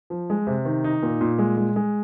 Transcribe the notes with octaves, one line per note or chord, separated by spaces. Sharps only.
F3
G#3
C3
D#3
D#4
A#2
A#2
G#3
G#3
G#3